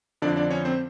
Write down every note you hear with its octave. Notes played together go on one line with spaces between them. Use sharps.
F2 D3 F3 D4 D5
D4 D5
C#4 C#5
C4 C5